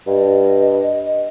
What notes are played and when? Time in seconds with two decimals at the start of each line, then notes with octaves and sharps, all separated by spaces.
0.07 G2 D#5